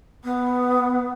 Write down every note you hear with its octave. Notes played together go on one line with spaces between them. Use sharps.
B3